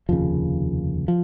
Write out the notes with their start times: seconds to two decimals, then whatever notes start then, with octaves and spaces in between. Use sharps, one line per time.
0.09 F1 D#2 C#3 F3
1.08 F3